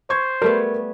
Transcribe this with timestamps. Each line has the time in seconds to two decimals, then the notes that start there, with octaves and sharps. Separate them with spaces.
0.10 C5 C#6 G#6
0.42 G3 A3 B3 A#4